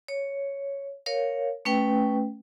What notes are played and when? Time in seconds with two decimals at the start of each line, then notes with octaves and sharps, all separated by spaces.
0.08 C#5
1.06 A#4 C#5 F5
1.65 A3 C#4 B4 G5